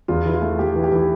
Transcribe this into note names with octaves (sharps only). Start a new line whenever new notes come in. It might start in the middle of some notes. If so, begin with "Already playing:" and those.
E2 F4
E3
F4
A3
A3 G4
E3
G4
E3